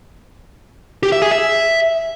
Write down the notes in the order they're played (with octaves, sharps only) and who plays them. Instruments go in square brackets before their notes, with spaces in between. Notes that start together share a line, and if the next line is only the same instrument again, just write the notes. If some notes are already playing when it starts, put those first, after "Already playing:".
[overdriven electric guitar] G4
E5
G#4
E5